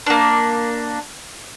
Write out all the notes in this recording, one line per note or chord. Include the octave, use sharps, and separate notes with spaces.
A#3 D4